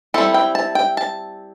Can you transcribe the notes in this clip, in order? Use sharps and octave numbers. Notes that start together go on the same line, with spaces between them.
G3 C4 E4 A4
G5
A5
G5
A5